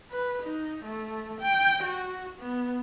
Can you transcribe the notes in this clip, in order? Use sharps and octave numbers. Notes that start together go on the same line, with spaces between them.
B4
D#4
A3
G5
F#4
B3